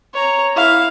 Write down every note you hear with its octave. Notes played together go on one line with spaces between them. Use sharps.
C#5 A#5
E4 F5